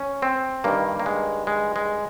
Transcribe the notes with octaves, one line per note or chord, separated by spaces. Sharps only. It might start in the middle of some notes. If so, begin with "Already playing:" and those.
Already playing: C#4
C4
G2 D#3 A#3
A#3
G#3
G#3
G#3